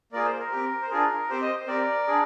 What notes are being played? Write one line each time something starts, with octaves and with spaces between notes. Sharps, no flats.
A#3 F4 G#4 A#4 D5
C5
A#4
C4 G4
C5
D4 F4 G#4 A#4
C4 G4 C5
C5 D#5
C5
C4 G4 A#4 D5
D4 G#4